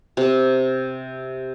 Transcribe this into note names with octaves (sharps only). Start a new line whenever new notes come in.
C3